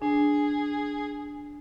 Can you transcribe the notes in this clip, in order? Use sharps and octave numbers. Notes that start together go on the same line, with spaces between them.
D4 G#4